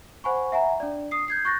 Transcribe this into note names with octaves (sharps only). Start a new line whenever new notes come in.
C5 F#5 G#5 B5 C#6
E5 F#5 G#5 A#5
D4 D5
D#6 C7
G6 G#6 C7
C#6 F#6 G6 A6 A#6